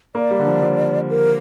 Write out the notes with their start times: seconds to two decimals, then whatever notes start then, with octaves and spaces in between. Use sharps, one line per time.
0.15 A#3 D5
0.31 G3
0.39 D3
0.47 F3
0.62 F3
1.09 A#4